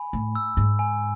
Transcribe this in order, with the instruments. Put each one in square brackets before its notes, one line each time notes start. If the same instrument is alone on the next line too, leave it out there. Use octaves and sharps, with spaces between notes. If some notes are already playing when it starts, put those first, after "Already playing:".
Already playing: [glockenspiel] G#5 B5
[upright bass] A2
[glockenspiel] E6
[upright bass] G#2
[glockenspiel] G#5